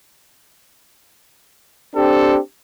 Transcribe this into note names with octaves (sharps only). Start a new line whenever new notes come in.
C4 D4 G4 A4